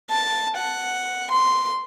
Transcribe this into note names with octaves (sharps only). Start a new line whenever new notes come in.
A5
F#5
C6